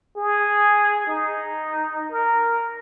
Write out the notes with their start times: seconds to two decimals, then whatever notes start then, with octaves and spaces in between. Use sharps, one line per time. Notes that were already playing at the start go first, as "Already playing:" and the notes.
0.17 G#4
1.07 D#4
2.11 A#4